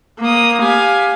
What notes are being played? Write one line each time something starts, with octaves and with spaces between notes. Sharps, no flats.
A#3 D#6
G4 F5 G#5